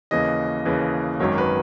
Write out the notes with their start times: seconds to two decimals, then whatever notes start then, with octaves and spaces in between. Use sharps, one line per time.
0.11 D#2 C#3 E3 D#5
0.65 D#2 C#3 E3
1.19 G#1 F#2 D#3 F#3 C#5
1.38 B4